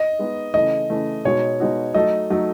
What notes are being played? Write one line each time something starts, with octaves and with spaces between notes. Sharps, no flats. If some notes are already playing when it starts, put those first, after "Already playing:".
Already playing: D#5
G#3 B3 D#4
C#3 E3 A3 D#5
C#3 E3 A3
B2 G#3 D#4 F#4 C#5
B2 G#3 D#4 F#4
F#3 A3 D#4 A4 D#5
F#3 A3 D#4 A4